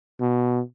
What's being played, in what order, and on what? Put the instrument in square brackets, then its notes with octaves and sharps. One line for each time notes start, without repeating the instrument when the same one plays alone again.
[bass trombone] B2